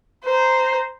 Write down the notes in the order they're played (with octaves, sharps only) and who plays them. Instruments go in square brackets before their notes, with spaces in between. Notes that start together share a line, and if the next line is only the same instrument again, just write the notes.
[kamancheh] C5 A#5